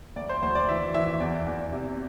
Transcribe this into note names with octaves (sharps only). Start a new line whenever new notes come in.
D2 D5
C5
D2 C5
D5
E3 E5
E3 E5
E2 D5
E2
C3